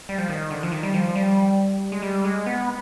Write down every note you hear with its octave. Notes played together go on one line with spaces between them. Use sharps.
G3
F3
D#3
D3
F3
D#3
G3
F3
G3
G#3
G3
G#3
B3